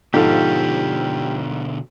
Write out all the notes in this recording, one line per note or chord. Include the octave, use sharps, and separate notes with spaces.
G#2 B2 D3 F3 G4 A4 F5